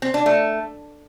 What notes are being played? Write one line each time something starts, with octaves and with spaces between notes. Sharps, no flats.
C4
D4
A3